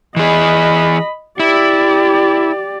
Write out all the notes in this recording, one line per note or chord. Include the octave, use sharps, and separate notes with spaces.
E3 G#4 D#5 B5
E4 G4 D5